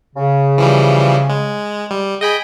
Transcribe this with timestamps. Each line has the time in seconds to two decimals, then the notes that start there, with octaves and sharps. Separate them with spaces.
0.16 C#3
0.58 E3 F3 G3
1.29 G#3
1.91 G3
2.21 G#4 D#5 G5 B5